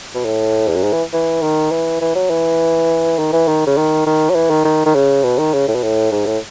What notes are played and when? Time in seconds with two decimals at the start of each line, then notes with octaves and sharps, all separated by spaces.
0.15 B2
0.25 A2
0.68 E2
0.76 F#2
0.83 G#2
0.93 E3
1.13 E3
1.43 D#3
1.71 E3
2.01 E3
2.15 F#3
2.30 E3
3.19 D#3
3.33 E3
3.48 D#3
3.67 C#3
3.77 D#3
4.06 D#3
4.30 F#3
4.35 E3
4.50 D#3
4.65 D#3
4.86 D#3
4.95 C#3
5.24 B2
5.38 D#3
5.54 C#3
5.68 A2
5.75 B2
5.83 A2
6.12 G#2
6.26 A2